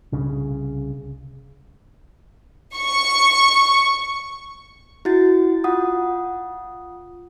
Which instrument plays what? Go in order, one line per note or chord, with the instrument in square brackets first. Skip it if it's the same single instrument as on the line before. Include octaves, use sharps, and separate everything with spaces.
[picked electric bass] C2 C#3
[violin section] C#6
[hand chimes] E4 F#4 A6
F4 F#5 D#6